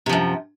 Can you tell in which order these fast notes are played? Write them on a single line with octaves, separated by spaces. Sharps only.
C3 F3 F#2